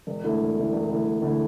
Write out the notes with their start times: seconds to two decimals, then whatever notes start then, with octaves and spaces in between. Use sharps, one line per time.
0.07 E1
0.23 D2 D3 A3 E4
0.40 E1
0.56 D2 D3 A3 E4
0.73 E1
0.89 D2 D3 A3 E4
1.05 E1
1.22 D2 D3 A3 E4